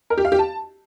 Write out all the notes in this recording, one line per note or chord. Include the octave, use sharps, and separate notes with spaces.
A#4
G4
F5
G4
A5